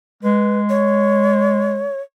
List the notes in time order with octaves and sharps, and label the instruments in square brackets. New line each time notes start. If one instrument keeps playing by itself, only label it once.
[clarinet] G#3 [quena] B4
[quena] C#5